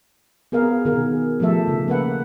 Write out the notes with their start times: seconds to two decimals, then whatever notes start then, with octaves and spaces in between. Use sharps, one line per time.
0.52 B3 G#4 A#4 F5
0.85 B2 D#3 B3 G#4 A#4
1.40 F3 A3 G4 A4 E5
1.68 C#3
1.88 A#3 B4 F#5